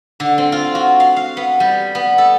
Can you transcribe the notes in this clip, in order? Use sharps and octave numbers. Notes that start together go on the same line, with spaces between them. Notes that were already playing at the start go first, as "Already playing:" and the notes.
D3
C4
F4
F#4
F5
F5
B3
G3
B3
A4